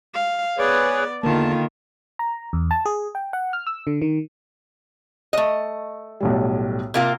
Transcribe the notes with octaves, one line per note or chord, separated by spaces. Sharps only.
F5
B3 G#4 B4 C#5 D5
E2 D3 D#3 A#3 F4 A5
A#5
E2
A5
G#4
G5
F#5
F6
E6
D3
D#3
A3 D#5
B1 A2 G3
C3 A#3 F4